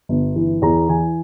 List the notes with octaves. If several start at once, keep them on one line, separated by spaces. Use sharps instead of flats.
G1
E3
E2 A#5
E3 G#5